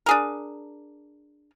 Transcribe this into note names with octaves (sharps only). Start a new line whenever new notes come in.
D4 G#4 A#4